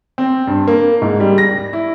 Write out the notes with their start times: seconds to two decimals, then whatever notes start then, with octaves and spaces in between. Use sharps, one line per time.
0.18 C4
0.47 G2
0.68 A#3
1.02 G#2
1.20 G3
1.38 A#6
1.73 E4